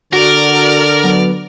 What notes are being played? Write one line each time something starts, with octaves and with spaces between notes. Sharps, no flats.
D3 F#4 A#4 D5 F6
F#3 B3